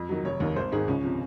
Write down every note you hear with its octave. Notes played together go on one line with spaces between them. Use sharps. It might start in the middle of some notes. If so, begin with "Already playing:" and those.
Already playing: F2
D#3 F#3
F1 C#5
D#2 D#3
G#1 C5
G#2 D#3 G#4
C#2 C#4
C3 F3